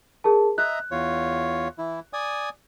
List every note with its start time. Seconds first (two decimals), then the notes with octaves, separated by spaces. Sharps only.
0.24 G#4 A#4 A5
0.58 D#5 E5 A#5 F#6
0.91 E2 F4 C#5
1.78 E3 E4
2.13 D5 G#5 D#6